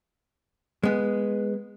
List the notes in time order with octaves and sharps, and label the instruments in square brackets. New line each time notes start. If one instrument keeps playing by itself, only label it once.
[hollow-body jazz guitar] G#3 B3